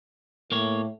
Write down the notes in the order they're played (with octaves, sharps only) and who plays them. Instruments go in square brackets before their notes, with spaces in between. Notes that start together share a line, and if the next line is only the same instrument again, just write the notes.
[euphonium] A2 [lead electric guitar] A#3 C#5